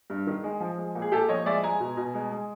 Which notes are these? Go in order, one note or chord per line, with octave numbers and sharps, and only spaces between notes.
G2
D#3
G#3
F3
G#3
A#2
G#4
A#2 G4 A4
F3 C#5 D#5
G#3 D5 E5
G#3 G#5 A#5
B2
B2
G#3
G#3